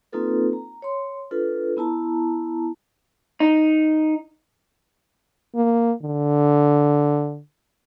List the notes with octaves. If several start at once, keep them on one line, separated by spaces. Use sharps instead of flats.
A#3 C4 D#4 F4 A4 B4
A#5
C#5 C6
D4 F4 A4 B4
B3 E4 A5 A#5
D#4
A#3
D3